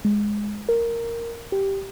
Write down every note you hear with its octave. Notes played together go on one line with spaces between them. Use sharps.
G#3
A#4
G4